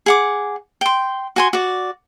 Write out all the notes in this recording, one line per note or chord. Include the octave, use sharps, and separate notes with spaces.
G#4 F#5 D6
G5 C6
F#4 G#5 C6
F#4 D5